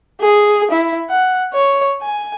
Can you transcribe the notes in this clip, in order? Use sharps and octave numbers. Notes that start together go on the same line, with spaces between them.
G#4
E4
F#5
C#5
G#5